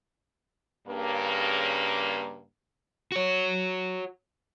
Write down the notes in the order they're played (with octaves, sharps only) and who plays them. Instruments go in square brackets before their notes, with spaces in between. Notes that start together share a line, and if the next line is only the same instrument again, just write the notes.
[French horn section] G2 C#3 A#3
[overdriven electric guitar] F#4 C#5